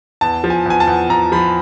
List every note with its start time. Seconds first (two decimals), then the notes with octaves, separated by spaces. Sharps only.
0.21 E2 A5
0.44 F3
0.50 G#5
0.66 E2 G#5
0.80 A5
0.87 E2
1.09 E2 A#5
1.32 F3 B5